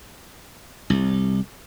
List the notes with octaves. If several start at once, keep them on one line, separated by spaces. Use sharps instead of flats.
C2